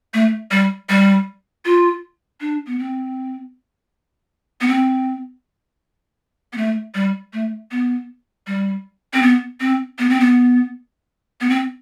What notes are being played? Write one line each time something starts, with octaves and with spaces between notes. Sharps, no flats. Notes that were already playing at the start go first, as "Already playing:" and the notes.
A3
G3
G3
F4
D4
B3
C4
B3
C4
B3
A3
G3
A3
B3
G3
C4
B3
C4
B3
C4
B3
B3
C4